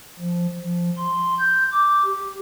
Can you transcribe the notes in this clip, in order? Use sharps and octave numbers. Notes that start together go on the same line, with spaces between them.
F3
F3
C6
G6
D6
G4